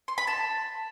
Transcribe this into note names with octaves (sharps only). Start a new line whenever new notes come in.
C6
B5
A5